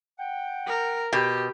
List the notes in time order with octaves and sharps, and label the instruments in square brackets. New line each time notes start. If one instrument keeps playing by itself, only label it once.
[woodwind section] F#5 G5
[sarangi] A#4
[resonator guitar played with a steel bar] B2 [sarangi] G4